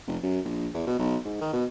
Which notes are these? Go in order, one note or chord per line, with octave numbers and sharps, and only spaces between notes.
F1
F#2
A#1
E2
B2
B1
G#2
D#3
B2